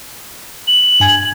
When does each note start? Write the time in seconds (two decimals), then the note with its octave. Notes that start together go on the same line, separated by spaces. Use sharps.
0.67 F#7
1.00 G2 G#5 G#6